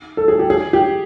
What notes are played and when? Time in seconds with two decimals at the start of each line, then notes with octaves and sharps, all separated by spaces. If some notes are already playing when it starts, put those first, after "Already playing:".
0.17 A4
0.28 G#4
0.39 G4
0.50 G#4
0.73 G4